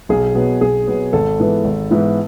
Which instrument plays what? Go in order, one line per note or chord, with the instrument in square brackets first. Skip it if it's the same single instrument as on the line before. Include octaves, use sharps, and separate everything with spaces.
[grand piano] B1 [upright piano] G#4
[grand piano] B2 F#3 B3
[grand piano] B1 [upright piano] G#4
[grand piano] B2 F#3 B3
[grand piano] G#1 [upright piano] A4
[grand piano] G#2 E3 B3 E4
G#1
G#2 E3 B3 E4